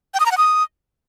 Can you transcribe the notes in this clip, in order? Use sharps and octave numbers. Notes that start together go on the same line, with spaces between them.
G5
D#6
A#5
F#5
D#6